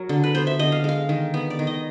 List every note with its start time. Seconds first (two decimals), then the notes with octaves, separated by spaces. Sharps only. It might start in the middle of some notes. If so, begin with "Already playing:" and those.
Already playing: F#3 A#4
0.09 D3
0.24 B4
0.35 B3 C5
0.47 E5
0.59 D3 D#5
0.72 F5
0.84 G#3 F5
1.09 D#3
1.34 B3
1.50 D5
1.59 D#3
1.67 D#5